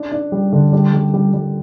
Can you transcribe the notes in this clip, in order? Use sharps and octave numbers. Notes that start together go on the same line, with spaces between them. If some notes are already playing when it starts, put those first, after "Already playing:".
Already playing: D4
D4
G3
D3
G3
G3
G3
G3